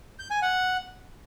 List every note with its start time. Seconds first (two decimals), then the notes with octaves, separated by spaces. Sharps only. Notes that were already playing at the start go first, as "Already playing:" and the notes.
0.19 G6
0.31 G#5
0.42 F#5